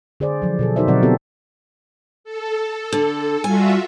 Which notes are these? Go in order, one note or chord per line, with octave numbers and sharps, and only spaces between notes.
D3 G#4 C5 D5
F3 F#3
B2 G#4 A4
D#4 F#4 A#4 C5 D5 E5
B2 D3 F#3 C4 D5 F#5
D3 B3 C4 F4 G4 A4
A4
D3
G3 F4 F#4 E5 G#5